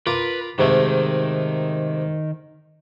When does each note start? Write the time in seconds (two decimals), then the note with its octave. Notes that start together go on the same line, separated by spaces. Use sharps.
0.07 F4 A#4 B4 D6
0.59 G#2 C3 D#3 A3